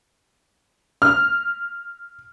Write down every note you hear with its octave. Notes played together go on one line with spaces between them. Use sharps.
F6